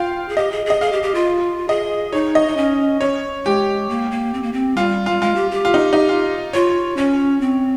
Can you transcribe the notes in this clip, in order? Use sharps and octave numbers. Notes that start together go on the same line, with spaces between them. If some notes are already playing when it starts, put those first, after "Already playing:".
Already playing: F4 F5 G5
G#4
G4 D#5
G#4
G#4 D#5
G#4 F5
G4
G4
F4
G#4 D#5
D#4 C#5
D#5
D#4
C#4
C#4 C#5
G#3 G4
A#3
A#3
C4
A#3
C4
G3 F4
G3 F4
G#3 F4
G4
G4
F4
D#4
D#4
F4
F4 C#5
C#4 C#5
C4